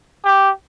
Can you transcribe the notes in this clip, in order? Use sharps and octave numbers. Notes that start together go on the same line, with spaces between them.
G4